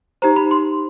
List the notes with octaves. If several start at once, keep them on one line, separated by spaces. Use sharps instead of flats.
D#4 G4 C5 A#5
B5
C6